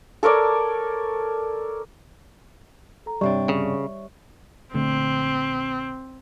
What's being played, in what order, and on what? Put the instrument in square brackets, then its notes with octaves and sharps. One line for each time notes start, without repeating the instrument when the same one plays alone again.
[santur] A4 A#4 C#5 D5
[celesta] A4 A#5
[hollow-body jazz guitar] G2 C3 D4 [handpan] G3 [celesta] C#5 E5 C#6
[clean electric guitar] C#3
[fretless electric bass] A#1 D3 A3 [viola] C4